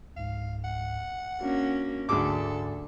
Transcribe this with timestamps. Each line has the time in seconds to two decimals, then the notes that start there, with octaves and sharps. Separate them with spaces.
0.17 C#2 G#2 F5
0.64 F#5
1.41 A#3 C#4 D4 F#4
2.09 D2 G#2 D3 G#4 A4 G#5 D6